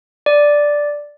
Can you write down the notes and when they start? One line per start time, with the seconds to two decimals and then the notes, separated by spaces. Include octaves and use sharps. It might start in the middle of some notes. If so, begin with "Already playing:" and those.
0.26 D5